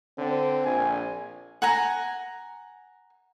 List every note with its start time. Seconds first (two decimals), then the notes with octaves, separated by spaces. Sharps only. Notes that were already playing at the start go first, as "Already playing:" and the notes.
0.18 D3 C4
0.65 A#1 G#5
1.62 F#5 G#5 A#5